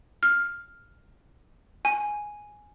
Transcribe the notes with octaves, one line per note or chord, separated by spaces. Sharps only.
F6
G#5